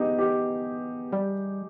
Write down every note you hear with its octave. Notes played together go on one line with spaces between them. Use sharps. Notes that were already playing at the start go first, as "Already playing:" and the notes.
Already playing: B3 D#4 G4 G#4
G4
G3